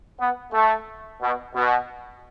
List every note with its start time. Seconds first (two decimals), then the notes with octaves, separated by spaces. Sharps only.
0.20 B3
0.53 A3
1.22 B2
1.55 B2